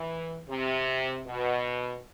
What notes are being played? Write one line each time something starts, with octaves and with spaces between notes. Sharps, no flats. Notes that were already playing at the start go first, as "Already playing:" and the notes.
Already playing: E3
C3
B2